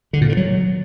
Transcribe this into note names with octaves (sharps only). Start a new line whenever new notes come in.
D3
A#2
D3
F#3